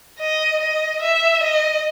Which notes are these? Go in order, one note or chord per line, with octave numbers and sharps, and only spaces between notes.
D#5
D#5
E5
D#5